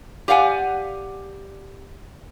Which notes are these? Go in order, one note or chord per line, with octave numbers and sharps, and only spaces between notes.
G4 D5 F5 F#5 G#5